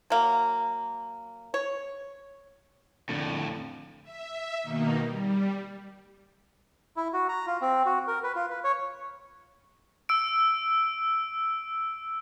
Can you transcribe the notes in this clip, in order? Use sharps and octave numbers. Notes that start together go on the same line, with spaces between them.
F#3 A#3
C#5
F2 A2 D3
E5
B2 D#3 A#3 D#4
G3
E4
F#4
A#5
F4
C4
F#4
A#4
B4
F4
B4
C#5
E6 D7